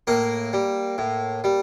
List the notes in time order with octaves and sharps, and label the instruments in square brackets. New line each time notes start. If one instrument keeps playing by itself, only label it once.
[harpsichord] A2 A#3 A#4
G3
A2
G3